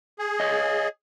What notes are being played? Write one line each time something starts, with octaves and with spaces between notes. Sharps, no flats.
G#4
C#5 D#5